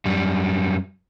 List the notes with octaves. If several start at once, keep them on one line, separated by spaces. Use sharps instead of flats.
F#2 G3